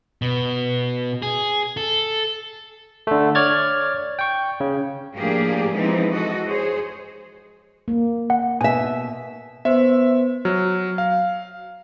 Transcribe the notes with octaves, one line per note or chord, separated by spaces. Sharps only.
B2
G#4
A4
D3 A3
C#5 D5 F6 G#6 A6
G5 C#6
C#3
A2 F3 A#3 D4 G4 G#4
E3 F3 G#3 B3 C4 D#4
F#4 A4 D#5
G#4 C5 C#5
A#3
F#5
B2 E5 G#5
B3 C5 E5
F#3 F6
F5